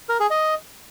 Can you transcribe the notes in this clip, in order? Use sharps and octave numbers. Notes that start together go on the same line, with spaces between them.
A#4
G#4
D#5